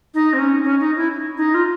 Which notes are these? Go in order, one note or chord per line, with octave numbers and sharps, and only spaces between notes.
D#4
C4
C#4
C#4
D#4
E4
D#4
F4